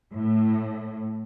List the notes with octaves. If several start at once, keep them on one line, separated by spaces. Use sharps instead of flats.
A2